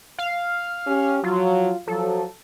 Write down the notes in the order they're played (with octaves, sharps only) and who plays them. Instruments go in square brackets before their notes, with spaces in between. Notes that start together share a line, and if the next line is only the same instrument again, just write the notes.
[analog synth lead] F5
[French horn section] C#4 G4
[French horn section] F3 F#3 [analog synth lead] F4
[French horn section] F3 F#3 [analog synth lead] A4